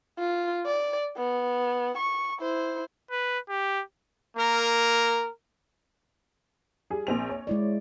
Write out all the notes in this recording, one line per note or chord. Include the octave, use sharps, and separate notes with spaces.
F4
D5
B3
C#6
E4 C5
B4
G4
A#3 A#4
G3 G#4
A#1 C4 F7
C#5
G#3 E4 D5